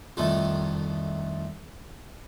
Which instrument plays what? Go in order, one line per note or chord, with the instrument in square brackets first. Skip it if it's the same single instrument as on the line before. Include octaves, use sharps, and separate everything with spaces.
[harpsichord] C2 F2 D#3 A3